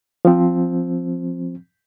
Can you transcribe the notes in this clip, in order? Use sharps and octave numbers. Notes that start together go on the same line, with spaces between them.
F3 C4